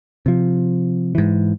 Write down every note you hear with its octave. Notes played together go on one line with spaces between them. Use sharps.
C3 F3
G#2 E3